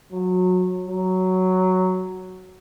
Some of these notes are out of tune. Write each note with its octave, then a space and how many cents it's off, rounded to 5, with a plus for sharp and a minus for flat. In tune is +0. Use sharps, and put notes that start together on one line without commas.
F#3 -20
F#3 +5